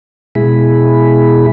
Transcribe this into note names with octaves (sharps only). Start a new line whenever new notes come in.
B2 G#3 E4 G#4 B5